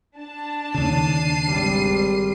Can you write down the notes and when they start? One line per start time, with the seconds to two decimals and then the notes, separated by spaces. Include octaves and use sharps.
0.18 D4 A5
0.74 D#2 C#3 C7 D#7
1.46 G#1 G3